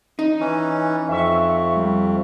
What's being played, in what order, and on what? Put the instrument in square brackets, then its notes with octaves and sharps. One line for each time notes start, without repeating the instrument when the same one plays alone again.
[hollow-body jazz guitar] D#4
[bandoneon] E3 C#4
[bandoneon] F2 [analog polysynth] E5 C#6
[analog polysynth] G3